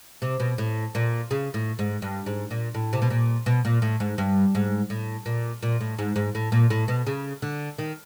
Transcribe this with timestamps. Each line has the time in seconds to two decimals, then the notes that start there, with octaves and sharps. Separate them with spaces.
0.22 C3
0.40 B2
0.58 A2
0.95 A#2
1.31 C#3
1.54 A2
1.79 G#2
2.02 G2
2.26 G#2
2.51 A#2
2.75 A2
2.93 C3
3.02 B2
3.10 A#2
3.46 B2
3.65 A#2
3.82 A2
4.00 G#2
4.18 G2
4.55 G#2
4.90 A2
5.26 A#2
5.63 A#2
5.80 A2
5.99 G#2
6.16 G#2
6.35 A2
6.52 A#2
6.70 A2
6.88 B2
7.07 C#3
7.42 D3
7.78 D#3